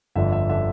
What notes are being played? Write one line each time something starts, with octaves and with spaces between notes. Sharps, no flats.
G1 F2 D3 E5
E5
D3 E5